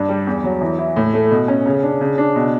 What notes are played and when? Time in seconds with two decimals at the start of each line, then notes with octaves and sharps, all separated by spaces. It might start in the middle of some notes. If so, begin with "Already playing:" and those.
Already playing: G2 D4
0.09 G3
0.27 E2
0.44 F#3
0.61 E3
0.79 E4
0.96 A2
1.14 A3
1.31 B2
1.48 C#4
1.66 C#3
1.83 D4
2.01 C#3
2.18 D4
2.36 B2